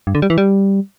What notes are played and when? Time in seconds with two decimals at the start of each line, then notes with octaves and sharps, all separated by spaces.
0.07 G2
0.15 D3
0.22 G3
0.30 E3
0.38 G3